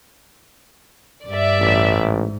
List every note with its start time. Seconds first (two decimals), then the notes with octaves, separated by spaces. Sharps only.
1.27 G2 D5 E5
1.59 A1
1.97 G#2